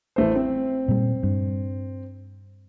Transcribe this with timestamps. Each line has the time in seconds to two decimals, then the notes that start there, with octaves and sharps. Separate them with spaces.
0.16 A1 A3 C5
0.36 C4
0.88 A#2 G3
1.23 G2